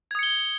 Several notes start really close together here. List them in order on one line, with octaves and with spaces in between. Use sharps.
G#6 D#6 C#7 G7